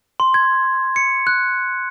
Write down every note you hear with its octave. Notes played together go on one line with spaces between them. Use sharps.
C6
G#6
C#7
F#6